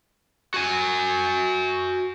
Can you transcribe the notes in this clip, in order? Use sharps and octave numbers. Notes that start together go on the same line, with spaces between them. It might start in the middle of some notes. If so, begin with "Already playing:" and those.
F#4 G#5